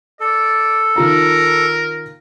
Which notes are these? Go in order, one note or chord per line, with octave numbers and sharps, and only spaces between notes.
A4 D5
D#3 F4 A#4 A#5